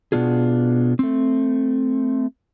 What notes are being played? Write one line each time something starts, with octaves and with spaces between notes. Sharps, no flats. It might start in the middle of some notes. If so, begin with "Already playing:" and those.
B2 B3 D4 F4 G#4
A3 C4